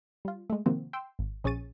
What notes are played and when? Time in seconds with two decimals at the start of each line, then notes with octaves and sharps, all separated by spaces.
0.25 G3 F4
0.50 G#3 A3
0.66 C3 D#3 F3 A#3 C4 F#4
0.93 G5 C6 E6
1.19 G#1
1.44 A#1 C#4 G#4 C#6 A6 D#7